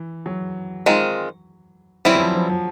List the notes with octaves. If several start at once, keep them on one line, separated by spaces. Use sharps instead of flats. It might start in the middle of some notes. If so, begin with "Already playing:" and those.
Already playing: E3
F#3
D#3 G#3 C4 F4
E3 F#3 G3 C4 E4
F#3
F3
F3
F3